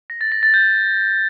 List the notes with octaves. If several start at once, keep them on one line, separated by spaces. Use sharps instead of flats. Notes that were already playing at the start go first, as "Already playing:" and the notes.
A#6
A6
A#6
A6
G6